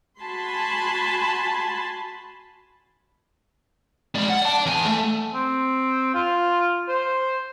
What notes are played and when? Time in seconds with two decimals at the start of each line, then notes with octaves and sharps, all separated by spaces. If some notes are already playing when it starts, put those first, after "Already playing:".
0.20 F#4 G#5 A5 B5 C6
4.15 G#3 D5
4.30 F#5
4.42 D5 A5
4.66 E2 G#5
4.86 A3
5.34 C4
6.15 F4
6.89 C5